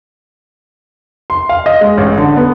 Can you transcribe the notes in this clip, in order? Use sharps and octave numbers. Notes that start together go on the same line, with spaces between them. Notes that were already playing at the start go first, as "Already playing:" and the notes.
C6
F5
D#5
G#3
A1
D3
B3